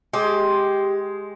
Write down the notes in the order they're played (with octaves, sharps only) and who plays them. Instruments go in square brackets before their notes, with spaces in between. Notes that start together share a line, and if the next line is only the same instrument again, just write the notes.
[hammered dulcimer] G#3 [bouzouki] G4